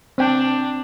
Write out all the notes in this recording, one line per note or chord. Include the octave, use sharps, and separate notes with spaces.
C4 D4 G5